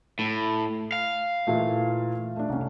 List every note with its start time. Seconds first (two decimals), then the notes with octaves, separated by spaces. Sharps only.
0.19 A2
0.92 F5
1.47 A#2 E3 A3
2.36 A3 D4
2.49 C2 C#4